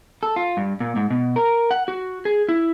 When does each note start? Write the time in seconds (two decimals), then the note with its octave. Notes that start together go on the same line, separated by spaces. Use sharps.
0.23 A4
0.36 F4
0.57 G2
0.80 A#2
0.96 G#2
1.10 B2
1.36 A#4
1.71 F#5
1.88 F#4
2.25 G#4
2.49 E4